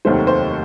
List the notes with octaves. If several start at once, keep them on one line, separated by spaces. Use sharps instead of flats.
F1 D#2 D#3 F#3 A3 C5
C5